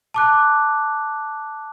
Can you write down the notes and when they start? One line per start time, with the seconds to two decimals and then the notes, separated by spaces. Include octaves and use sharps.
0.14 A5 D6 F#6